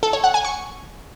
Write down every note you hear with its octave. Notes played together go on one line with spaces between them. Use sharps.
A4
C#5
F#5
G#5
C#6